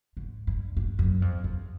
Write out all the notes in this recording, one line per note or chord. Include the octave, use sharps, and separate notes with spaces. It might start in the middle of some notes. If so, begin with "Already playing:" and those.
G#2
G2
G2
F#2
F2
E2